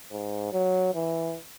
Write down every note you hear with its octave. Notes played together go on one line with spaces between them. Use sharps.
G#2
F#3
E3